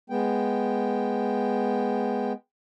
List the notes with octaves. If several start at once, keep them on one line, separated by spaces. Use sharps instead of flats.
G#3 B3 G5